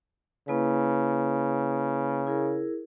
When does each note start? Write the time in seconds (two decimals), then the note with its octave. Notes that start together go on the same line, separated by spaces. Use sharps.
0.48 C#3 A#3 E4 B4
2.27 E4 G#4 A#4